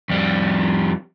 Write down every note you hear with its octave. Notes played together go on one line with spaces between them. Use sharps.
F2 G3